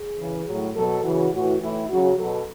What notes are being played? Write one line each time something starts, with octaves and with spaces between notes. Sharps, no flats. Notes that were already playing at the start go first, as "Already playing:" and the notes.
Already playing: G#4
C#3 E3
A2 F#3
B2 F#3 A4
C#3 E3 F#4
A2 E3 F#4
A2 E3 E4
C#3 F#3 F#4
B2 F#3 A4